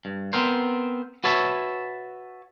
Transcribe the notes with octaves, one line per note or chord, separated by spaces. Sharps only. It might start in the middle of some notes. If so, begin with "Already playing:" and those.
G2
B3 C4 A#4 C5
F#4 B4 C#5 E5 A5